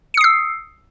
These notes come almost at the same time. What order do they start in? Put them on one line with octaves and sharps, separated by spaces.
C#7 D#6 C7 E6